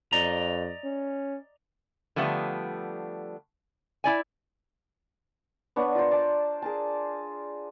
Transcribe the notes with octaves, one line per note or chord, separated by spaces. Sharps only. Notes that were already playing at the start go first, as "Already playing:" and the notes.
F2 D5 D#5 A#5
C#4
D3 F3 G3 A3 B3 D4
E4 D5 G#5
B3 D4 C#5 F#5
F4 A#4 C5
D5 A5
G#4 A#4 A5